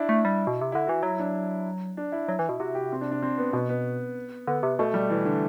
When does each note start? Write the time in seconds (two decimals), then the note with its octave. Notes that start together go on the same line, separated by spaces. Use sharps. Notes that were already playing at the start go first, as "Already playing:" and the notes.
Already playing: D4 E4
0.09 A3
0.25 G3
0.47 B2
0.61 C3
0.72 D3 E4
0.87 E3 F#4
1.02 F#3 E4
1.19 D4
1.97 D4
2.12 E4
2.28 F#3
2.39 E3
2.49 B2
2.60 C3 F#4
2.75 G4
2.92 C4
3.01 D4
3.11 D4
3.22 C4
3.38 B3
3.53 B2 B3
3.69 B3
4.47 D3 B3
4.63 C3
4.79 B2 A3
4.94 G3
5.10 E3
5.25 D3